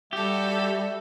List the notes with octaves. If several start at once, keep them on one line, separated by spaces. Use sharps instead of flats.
G3 F#4 G4 A4 E5